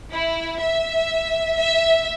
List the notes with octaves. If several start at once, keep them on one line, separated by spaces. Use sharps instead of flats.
E4
E5
E5